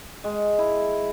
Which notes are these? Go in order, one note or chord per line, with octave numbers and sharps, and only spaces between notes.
G#3
E4